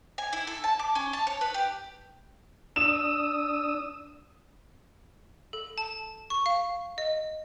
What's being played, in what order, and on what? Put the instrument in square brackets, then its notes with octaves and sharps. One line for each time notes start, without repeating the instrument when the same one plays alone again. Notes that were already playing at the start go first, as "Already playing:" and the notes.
[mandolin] G#5
E4
A4
A5
D6
C#4
A5
C#5
B4
G4
[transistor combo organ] D4 D#6 E6 [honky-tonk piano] E7
[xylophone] A4
A5
C#6
F5
D#5